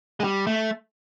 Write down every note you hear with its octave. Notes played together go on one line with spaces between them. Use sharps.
G#3
G3
A3